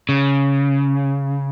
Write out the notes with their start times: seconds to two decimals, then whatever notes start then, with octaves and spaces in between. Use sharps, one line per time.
0.09 C#3